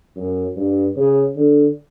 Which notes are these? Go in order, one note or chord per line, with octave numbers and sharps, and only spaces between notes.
F#2
G2
C#3
D3